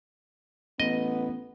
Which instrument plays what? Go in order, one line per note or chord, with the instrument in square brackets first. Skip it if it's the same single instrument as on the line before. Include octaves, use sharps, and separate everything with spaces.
[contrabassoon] A1 [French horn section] B3 [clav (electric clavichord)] D#5